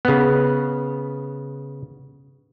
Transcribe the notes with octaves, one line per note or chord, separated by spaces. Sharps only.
C#3 B3